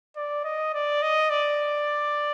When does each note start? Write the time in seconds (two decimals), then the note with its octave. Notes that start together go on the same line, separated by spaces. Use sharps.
0.16 D5
0.44 D#5
0.74 D5
1.02 D#5
1.30 D5